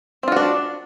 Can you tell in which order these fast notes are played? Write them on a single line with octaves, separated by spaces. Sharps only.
C4 F4 F#4 D4